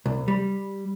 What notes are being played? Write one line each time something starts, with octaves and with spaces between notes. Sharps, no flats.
C2
G3